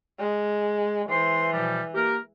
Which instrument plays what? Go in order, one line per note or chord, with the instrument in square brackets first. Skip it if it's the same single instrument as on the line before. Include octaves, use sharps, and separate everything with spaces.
[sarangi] G#3
[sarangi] E3 [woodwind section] C5 C6
[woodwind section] B2 F3 G3
A#3 G4 A#4